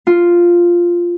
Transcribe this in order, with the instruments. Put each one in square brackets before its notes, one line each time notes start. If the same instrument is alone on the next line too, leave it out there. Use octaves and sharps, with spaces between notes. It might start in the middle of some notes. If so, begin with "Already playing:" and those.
[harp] F4